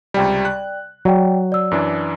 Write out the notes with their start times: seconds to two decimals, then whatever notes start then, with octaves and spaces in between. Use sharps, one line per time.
0.14 C#2 C3 G3 D5 G5
0.45 F#6
1.05 F#3 D5 G5
1.52 D5 E6
1.71 F#2 E3 D4